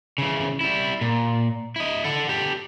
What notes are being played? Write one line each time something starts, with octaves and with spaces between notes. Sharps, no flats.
C#3 E3
G3 E4
A#2
E4 D#5
A4 F#5
G4 A4